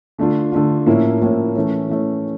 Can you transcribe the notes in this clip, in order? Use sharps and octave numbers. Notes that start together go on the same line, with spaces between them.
D3 A3 D4 F4
D3 A3 D4 F4
A2 F3 A#3 C#4 E4
A2 F3 A#3 C#4 E4
E3 A3 C#4
E3 A3 C#4